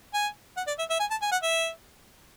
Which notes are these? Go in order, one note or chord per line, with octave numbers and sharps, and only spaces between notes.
G#5
F#5
D5
E5
E5
G#5
A5
G#5
F#5
E5